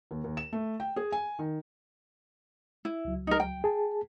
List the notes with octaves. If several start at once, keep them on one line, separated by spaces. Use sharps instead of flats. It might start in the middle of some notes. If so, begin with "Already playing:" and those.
D#2
D#2
E7
A3
G5
G#4
G#5
D#3
E4
C#2 F#3
D#4 A#4
G5
G#4 A5